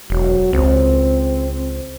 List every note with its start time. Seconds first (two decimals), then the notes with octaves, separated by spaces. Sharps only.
0.10 E1 F#3
0.53 C#2 C4